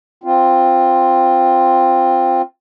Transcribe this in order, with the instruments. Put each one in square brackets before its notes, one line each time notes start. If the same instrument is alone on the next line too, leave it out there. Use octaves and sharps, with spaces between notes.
[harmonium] C4 F4